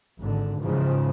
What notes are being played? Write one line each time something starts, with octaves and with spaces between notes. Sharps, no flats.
G#1 D3
G#2 C#3 E3 F3